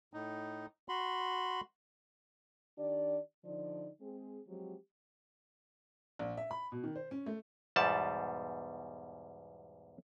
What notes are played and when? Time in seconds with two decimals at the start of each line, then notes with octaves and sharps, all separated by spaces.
0.14 A2 D#4
0.89 F#4 B5 C6
2.78 D#3 D4 G4 D5
3.44 D3 F3 D#4 D5
4.01 G#3 C4 G#4
4.48 F3 F#3 G#3 C4 F#4 G4
6.19 A#1
6.37 E5
6.51 B5
6.72 B2
6.84 D#3
6.96 C5
7.11 C#4
7.26 A3
7.76 E2 G#2 B2 G3 A5